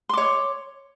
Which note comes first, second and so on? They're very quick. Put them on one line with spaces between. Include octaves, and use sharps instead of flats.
C6 D6 C#5